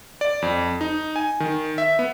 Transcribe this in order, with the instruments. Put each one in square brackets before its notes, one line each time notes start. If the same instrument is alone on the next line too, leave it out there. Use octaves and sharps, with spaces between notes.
[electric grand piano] D5
F2
D#4
G#5
D#3
E5
B3